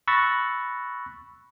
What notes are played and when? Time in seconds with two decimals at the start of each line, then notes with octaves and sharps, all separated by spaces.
0.08 B5 C#6 E6 F#6 A6 A#6